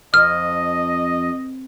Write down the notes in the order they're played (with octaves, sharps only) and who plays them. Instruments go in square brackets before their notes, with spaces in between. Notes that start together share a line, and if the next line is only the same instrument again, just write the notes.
[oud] F2 [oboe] D#5 [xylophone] F6